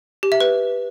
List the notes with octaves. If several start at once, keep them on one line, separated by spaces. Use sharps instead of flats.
G4
E5
B4